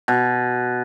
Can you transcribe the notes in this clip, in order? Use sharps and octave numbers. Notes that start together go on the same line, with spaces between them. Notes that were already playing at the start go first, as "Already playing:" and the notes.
B2